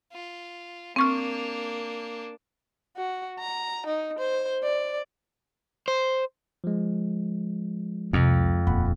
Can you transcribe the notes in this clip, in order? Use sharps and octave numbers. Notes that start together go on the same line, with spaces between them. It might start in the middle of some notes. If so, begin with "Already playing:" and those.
F4
A#3 C4 D4 C#6 F6
F#4
A#5
D#4
C5
D5
C5
F3 G#3
C2 F2 C3
D#1 F#5 B5